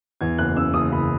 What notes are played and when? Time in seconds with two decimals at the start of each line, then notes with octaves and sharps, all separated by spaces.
0.21 E2 G#6
0.38 F#1 F#6
0.57 C#3 E6
0.74 F#1 D#6
0.92 F#1 B5